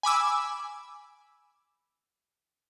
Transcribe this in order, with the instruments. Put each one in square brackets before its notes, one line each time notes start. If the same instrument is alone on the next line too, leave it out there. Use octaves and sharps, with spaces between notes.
[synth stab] G#5 B5 D6 E6